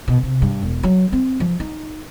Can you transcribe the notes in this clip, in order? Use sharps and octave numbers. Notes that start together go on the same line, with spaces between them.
B2
C3
G2
E1
F#3
C4
F3
D#4